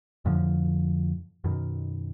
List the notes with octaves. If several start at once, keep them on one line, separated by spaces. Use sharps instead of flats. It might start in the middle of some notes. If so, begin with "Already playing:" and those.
F2 A2 D3 F3
F#2 B2 D#3